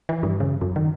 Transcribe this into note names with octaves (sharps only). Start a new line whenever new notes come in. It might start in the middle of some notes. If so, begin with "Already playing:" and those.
E3
G2
C#3
F#2
D#3